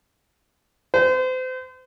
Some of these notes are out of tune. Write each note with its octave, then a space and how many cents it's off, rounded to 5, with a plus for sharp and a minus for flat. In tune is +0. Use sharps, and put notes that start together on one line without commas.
C5 -35